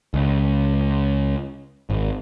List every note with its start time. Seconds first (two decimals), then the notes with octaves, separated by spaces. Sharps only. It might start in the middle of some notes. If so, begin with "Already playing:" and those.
0.14 C#2
1.90 G#1